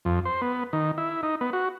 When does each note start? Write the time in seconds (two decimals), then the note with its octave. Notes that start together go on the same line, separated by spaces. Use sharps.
0.05 F2
0.25 C5
0.42 B3
0.73 D#3
0.98 E4
1.23 D#4
1.41 B3
1.53 F#4